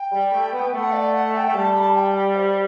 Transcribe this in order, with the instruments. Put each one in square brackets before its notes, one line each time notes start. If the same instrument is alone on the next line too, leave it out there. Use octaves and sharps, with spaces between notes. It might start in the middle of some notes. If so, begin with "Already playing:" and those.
Already playing: [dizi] G5
[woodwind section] G3
A3
B3
B3
[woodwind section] A3 [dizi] G5
[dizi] F#5
D5
F#5
A5
G5
[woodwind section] A3
[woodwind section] G3 [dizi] A5
[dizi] B5
A5
G5
G5
C5